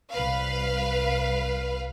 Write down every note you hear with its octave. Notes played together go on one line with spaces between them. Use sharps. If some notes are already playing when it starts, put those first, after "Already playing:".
C2 B4 F5